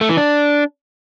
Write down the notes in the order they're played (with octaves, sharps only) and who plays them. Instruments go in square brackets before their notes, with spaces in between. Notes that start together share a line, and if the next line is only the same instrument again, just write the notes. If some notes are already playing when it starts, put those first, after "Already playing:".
[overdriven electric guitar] A3
E3
D4